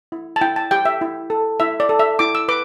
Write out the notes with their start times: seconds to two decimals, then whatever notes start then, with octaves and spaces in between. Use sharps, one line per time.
0.12 E4
0.36 A5
0.41 E4 G5
0.56 A5
0.71 G4 G5
0.85 E5
1.01 E4
1.30 A4
1.60 E4 E5
1.80 D5
1.89 A4
1.99 E5
2.19 E4 D6
2.35 E6
2.49 B4 D6